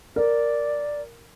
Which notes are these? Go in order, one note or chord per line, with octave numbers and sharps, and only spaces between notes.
A#4 D5